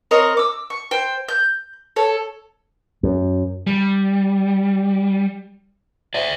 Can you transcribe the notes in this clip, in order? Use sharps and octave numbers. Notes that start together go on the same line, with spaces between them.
C4 A#4 C#5 D#5
D6 E6
C#6
C5 G5
G6
A4 C#5
F#2
G3
D5 E5